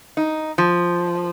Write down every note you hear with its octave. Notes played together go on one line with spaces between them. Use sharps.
D#4
F3